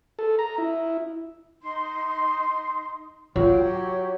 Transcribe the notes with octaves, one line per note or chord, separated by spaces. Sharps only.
A4
A#5
E4
D#4 C6
F#3 F4 F5 G5
G4 C#5